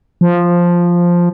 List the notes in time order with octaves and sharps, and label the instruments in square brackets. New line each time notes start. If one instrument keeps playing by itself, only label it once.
[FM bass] F3